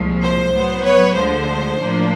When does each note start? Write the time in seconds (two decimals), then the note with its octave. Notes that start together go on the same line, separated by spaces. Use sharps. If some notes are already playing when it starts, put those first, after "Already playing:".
Already playing: C2 A#2 F3 G#3
0.20 C5
0.52 A2 F#3 B3
0.84 B4 C#5
1.16 D2 D3 F3 G#3 C5
1.78 A2 F3 A#3 D4